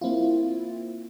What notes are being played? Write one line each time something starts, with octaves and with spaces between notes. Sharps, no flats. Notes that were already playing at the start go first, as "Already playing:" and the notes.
A#3 C4 E4 F4